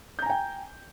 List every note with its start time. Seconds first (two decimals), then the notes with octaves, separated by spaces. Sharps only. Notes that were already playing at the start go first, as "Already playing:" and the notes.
0.19 G6
0.22 A#5
0.26 G#5
0.30 G5